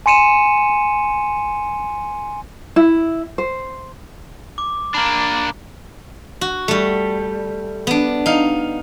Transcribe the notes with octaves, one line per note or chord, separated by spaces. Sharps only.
G#5 C6 C#7 D#7 E7
E4
C5
D6
A#3 D4 A#5 B5
F#4
G3 A3
B3 D4
D#4 F5